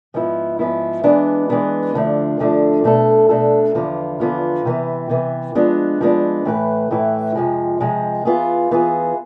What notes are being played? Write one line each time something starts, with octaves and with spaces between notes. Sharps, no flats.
G#2 F3 B3 E4
G#2 F3 B3 E4
E3 G#3 B3 D4
E3 G#3 B3 D4
D2 D3 F3 A3 D4
D2 D3 F3 A3 D4
B2 A3 D4 A4
B2 A3 D4 A4
E2 D3 F3 B3 F4
E2 D3 F3 B3 F4
C3 E3 B3
C3 E3 B3
F3 G#3 B3 D4
F3 G#3 B3 D4
A2 E3 A3 E4 B4
A2 E3 A3 E4 B4
F2 C3 F3 G#3
F2 C3 F3 G#3
E3 B3 F4 G#4
E3 B3 F4 G#4